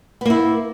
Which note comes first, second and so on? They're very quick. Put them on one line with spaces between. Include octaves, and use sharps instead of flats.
B3 A#3 E4